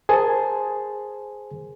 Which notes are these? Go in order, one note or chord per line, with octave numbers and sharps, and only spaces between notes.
G#4 A#4 C5 G#5 A5